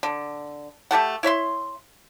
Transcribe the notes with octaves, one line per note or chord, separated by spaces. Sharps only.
D3
A3 G4 A4 F#5
E4 C#5 E5 C6